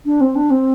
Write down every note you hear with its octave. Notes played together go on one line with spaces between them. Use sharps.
D4
C4
D4
C4